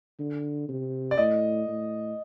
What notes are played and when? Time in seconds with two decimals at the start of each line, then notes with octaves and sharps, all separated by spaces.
0.19 D3
0.69 C3
1.11 D5
1.18 A2 D#5
1.68 A2